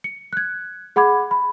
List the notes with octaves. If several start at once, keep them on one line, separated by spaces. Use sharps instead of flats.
C#7
F#6 G#6
G#4 F#5 B5 D6 G#6
B5